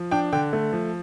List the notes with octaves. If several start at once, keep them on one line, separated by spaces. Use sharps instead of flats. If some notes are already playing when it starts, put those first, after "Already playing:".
Already playing: F3
D4 G5
D3 G5
A3
F3